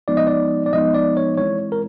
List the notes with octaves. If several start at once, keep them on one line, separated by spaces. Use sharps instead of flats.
F3 G#3 B3 D#4 D5
D#5
D5
D5
F3 G#3 B3 D#4 D#5
D5
C#5
E3 G#3 C4 E4 C#5
A#4